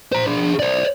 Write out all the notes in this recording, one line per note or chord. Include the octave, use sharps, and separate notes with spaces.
C5 A#5
D4 G#4
C5 D5